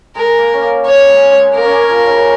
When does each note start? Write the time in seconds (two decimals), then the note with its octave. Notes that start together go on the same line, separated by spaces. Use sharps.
0.15 G#3 A#4
0.38 A#3
0.53 C#4
0.61 A#3
0.84 A#3 C#5
1.07 G#3
1.31 G#3
1.54 A#3 A#4
1.65 C#4
1.71 A#3
1.89 F3
2.06 C#3